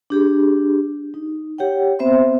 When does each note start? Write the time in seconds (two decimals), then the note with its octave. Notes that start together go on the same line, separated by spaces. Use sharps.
0.10 D4 G4 G#4
1.14 D#4
1.58 G4 C#5 F#5 G5
1.99 B3 C4 C5 E5 C6